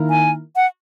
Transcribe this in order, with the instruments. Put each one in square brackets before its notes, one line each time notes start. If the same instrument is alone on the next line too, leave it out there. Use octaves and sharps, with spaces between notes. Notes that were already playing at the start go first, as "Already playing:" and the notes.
Already playing: [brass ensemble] D#3 A#3 E4 A#4
[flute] G#5
F#5